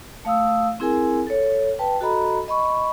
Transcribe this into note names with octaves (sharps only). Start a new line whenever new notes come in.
A3 F5 D#6 E6
C4 E4 G#4 A#4 G#5
A4 C#5
B4 G5 A5
F#4 A4 D#5 A#5 B5
D#5 B5 C#6